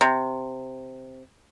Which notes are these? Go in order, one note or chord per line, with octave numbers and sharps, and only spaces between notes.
C3